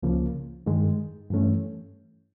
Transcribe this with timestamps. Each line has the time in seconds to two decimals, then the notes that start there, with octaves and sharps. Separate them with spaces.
0.03 C#2 C#3 F3 A#3
0.66 G2 D#3 G#3
1.30 G2 E3 A3 C#4